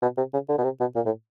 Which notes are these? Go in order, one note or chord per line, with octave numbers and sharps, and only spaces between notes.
B2
C3
C#3
D3
B2
C3
B2
A#2
A2